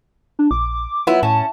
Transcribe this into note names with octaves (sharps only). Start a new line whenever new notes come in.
D4
A#1 D6
F#3 B3 E4 F4
A2 C#4 A5